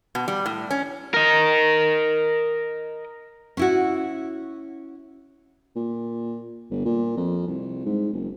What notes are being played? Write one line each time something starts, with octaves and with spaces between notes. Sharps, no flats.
B2
G3
A2
C#4
A#4 D#5
C#4 E4 F#4
A#2
G1
A#2
F2
C2
G#2
F#1